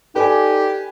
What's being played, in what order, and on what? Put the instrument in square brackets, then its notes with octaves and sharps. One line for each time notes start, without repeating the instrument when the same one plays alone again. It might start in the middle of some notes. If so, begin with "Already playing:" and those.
[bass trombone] D#4 [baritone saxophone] G4 [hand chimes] A4 D5 D6 [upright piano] B4 G#5